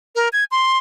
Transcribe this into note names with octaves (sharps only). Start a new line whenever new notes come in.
A#4
G#6
C6